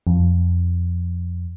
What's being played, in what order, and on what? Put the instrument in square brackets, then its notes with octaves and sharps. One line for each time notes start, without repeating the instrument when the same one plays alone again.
[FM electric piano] F2